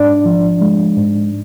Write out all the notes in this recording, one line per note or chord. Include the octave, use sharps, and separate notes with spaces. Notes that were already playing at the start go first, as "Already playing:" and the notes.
Already playing: G#2 D4 D5
F3
G#3
G#2